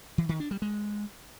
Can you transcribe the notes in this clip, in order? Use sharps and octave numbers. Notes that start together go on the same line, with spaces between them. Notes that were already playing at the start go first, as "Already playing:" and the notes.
E3
D#3
D4
G3
G#3